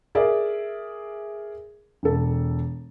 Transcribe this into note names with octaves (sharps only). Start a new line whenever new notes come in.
G#4 A#4 D5 E5
E1 A4